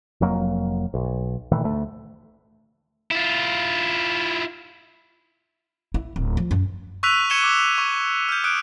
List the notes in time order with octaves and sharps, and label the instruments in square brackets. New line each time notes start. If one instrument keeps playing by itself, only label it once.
[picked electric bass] F1 F2 F#3 A#3
B1
A#2 D#3 E3 A3
D2 A3
[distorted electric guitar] E4 F4
[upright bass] E4
D1
F3
F#2
[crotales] C#6 E6 F#6 B6 D#7 F7
C#6 G#6 C#7 D#7 E7 G7
D6
C#6
F6 G6
D#6 F#6 D7